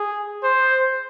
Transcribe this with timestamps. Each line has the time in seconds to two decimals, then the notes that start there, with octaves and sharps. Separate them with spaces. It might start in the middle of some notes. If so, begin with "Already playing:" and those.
Already playing: G#4
0.43 C5